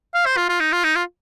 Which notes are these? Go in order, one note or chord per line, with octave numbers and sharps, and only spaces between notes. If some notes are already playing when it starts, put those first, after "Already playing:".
F5
C5
F4
F4
D#4
F4
D#4
F4